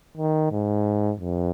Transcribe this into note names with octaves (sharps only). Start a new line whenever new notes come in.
D#3
G#2
F2